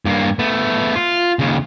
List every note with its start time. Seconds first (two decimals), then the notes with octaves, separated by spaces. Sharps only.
0.06 G2 A#3
0.39 A3 B3
0.95 F4
1.39 D#2 C#3